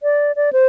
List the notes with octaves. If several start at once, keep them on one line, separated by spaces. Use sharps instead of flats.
D5
D5
C5